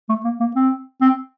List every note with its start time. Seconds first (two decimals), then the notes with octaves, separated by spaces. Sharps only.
0.09 A3
0.24 A#3
0.40 A#3
0.56 C4
1.01 C4